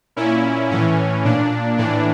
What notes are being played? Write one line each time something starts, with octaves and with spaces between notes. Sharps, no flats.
A#2 C#4 E4
A2 E3 C#4
A#2 D4
A2 E3 D4